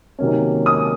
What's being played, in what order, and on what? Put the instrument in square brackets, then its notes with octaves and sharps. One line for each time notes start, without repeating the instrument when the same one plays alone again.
[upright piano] C3 D#3 F#3 A#3 C#4
D#6